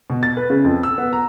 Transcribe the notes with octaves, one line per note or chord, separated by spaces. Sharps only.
B2
A6
B4
C#3
F2
E6
B3
A#5